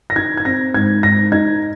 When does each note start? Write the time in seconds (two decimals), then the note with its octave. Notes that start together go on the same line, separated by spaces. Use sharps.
0.10 A#6
0.16 D#4 G#6
0.37 G#6
0.45 C4 A#6
0.74 G#2 G#6
1.03 G#2 A#6
1.32 D#4 G#6